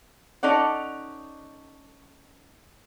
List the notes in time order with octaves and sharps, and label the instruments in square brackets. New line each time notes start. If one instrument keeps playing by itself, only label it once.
[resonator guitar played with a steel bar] C#4 D#4 A4 D5 F#5